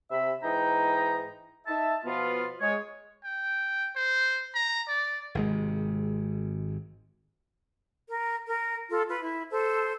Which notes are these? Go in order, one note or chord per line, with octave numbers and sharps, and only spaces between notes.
C3 E5 B5
G#2 E3 D#4 G5 A#5
D#4 E5 A5
B2 F3 B3 F4
G#3 C#5
G5
C5
A#5
D5
G#1 C3 G#3
A#4
A#4
F4 A4
F4 B4
E4
A4 C5